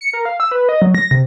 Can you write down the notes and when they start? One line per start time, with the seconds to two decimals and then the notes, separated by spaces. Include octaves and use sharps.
0.01 C#7
0.13 A#4
0.25 F5
0.40 E6
0.51 B4
0.69 D#5
0.82 F#3
0.95 A#6
1.11 C3